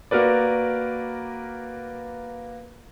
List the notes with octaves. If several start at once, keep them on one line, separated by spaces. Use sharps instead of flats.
A#3 F#4 A#4 B4 D5